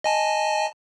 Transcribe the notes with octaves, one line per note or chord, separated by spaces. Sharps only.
D#5 G#5 A5